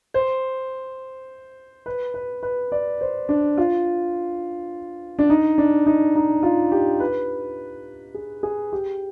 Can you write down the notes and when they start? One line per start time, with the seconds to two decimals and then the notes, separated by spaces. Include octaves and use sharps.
0.14 C5
1.86 B4
2.14 B4
2.43 B4
2.72 D5
3.01 C5
3.29 D4
3.58 F4
5.19 D4
5.30 D#4
5.58 D4
5.86 D#4
6.15 D#4
6.43 F4
6.72 G4
7.00 B4
8.14 G#4
8.43 G#4
8.73 G4